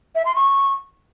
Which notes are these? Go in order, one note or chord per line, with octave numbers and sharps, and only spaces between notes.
E5
C6
C#6